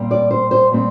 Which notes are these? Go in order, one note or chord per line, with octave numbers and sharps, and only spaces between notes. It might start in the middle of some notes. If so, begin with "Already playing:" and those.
Already playing: A#2 G3 C4
D5
C5
C5
A#2 G3 C4